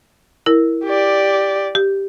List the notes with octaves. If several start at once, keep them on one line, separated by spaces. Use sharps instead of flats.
E4 A#4
G4 D5
G4